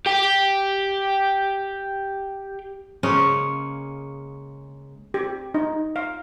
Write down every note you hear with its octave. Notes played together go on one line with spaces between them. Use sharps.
G4 G5
C#3 G#3 A#3 C#4
G4
D#4
F5